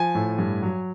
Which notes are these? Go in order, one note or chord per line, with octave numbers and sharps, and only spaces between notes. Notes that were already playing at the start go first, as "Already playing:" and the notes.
Already playing: F3 G#5
A2
G2
F#3